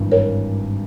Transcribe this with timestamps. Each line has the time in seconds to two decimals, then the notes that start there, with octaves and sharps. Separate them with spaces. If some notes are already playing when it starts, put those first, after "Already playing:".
Already playing: G#1 G2 E3
0.12 A#4 C#5